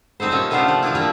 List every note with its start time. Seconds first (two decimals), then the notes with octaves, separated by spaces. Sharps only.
0.20 G3 C4 D#4 A4 C5
0.32 A#2 C#4 A4 G#5
0.50 C3 A3 B3 D4 F4 C5
0.68 F3
0.83 E3 F3 D4 E4
0.95 F3 G3 A#3 E4